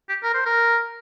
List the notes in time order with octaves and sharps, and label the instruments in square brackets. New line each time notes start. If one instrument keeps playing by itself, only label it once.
[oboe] G4
A#4
C5
A#4